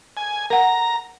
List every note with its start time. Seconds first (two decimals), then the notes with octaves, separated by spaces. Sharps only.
0.17 G#5
0.50 A#4 F#5 A#5